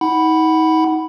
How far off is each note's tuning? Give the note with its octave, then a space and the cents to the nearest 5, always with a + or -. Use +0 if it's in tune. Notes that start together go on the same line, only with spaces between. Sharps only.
D#4 +35 F#5 +15 B5 +0